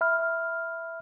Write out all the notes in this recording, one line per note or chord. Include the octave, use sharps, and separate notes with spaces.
E5 B5 F6